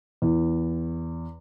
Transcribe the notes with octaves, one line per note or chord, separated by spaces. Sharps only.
E2